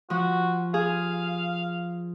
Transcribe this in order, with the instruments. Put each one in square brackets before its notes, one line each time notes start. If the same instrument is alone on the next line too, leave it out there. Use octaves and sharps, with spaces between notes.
[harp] F3 [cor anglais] F#4
[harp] G#4 [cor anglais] F5